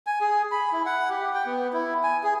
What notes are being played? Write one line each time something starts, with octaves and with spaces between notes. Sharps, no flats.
G#5
G#4
B5
E4
F#5
G4
G5
B3
E4
G#5
G#4